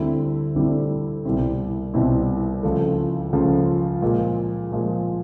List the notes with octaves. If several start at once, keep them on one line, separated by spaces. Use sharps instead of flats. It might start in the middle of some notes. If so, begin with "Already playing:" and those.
Already playing: D2 D3 G3 C4 E4
D2 D3 G3 C4 E4
C2 B2 G3 C4 E4
C2 B2 G3 C4 E4
C#2 C#3 F3 A3
C#2 C#3 F3 A3
A#2 F3 G#3
A#2 F3 G#3